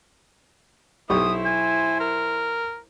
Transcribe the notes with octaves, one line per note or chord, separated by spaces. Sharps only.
B1 E4 G4 C5 C#6 D#6
G#5
A#4